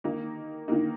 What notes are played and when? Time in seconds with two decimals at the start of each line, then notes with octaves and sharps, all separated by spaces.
0.04 D#3 A#3 D#4
0.68 D#3 A#3 D#4